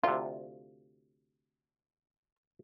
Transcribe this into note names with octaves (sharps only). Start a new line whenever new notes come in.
D2 C3 F4